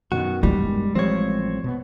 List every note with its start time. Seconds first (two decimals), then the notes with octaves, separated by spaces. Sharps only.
0.12 F#2 B2 D#3 F#4
0.43 G3 G#3
0.95 A1 F3 G3 C4 C#5
1.64 B2 B3